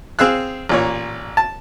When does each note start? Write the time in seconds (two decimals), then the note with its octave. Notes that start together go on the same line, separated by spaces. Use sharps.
0.19 C4 G#4 F5 E6 F#6
0.69 A1 A#2 C#5
1.37 A5